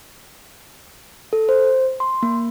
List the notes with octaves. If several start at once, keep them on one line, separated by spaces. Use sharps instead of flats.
A4
C5
C6
A#3